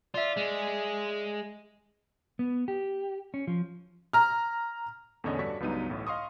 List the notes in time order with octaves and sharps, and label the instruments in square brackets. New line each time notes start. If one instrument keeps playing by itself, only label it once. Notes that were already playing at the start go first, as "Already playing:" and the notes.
[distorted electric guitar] F4 [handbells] D5 E5
[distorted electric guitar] G#3
[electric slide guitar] B3
G4
C#4
F3
[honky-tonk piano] A#5 F6
[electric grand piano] E2 A2 D3 C#4 C#5 D#5
G2 F#4 A4 D5 C#6 B6
C#2 G2 F#3 B3 D#4 D#7
A1 A2
D#5 F5 C6 C#6 D#6